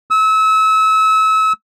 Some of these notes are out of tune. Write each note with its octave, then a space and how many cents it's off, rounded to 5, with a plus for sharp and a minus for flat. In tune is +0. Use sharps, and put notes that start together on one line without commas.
E6 -30